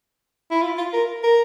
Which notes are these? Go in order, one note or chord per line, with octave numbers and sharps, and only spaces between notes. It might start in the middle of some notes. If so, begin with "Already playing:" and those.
E4
F4
F4
A#4
A#4